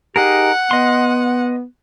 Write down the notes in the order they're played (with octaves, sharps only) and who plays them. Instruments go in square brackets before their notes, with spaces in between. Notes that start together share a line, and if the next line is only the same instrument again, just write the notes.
[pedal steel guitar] D#4 G#4 A#4 [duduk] G4 [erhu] F#5
[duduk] B3 [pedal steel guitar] D#5 C6